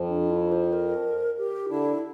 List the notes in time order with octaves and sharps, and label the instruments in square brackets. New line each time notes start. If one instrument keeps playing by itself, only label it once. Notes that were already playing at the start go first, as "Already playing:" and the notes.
Already playing: [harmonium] F2 F3
[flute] D4
E4
C5
A#4
G4
[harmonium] D3 D4 [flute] E4